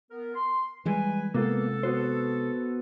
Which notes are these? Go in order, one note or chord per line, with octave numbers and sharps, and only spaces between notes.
B3 A#4
C6
E3 G3 G#3 B4 G#5
C3 G#3 A#3 B3 F4 A4
B3 F#4 C5